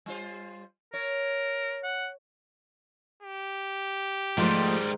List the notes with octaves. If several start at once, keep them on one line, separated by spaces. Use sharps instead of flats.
G3 F4 C5
A#4 C#5
F#5
G4
G#2 D#3 F3 G3 A3 C6